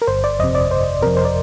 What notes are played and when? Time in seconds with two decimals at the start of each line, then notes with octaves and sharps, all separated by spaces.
0.02 A#4
0.07 G1 C5
0.24 D5
0.40 F2 C3 D#5
0.55 D5
0.71 G1 C5
1.02 F2 C3 A#4
1.17 C5
1.25 D5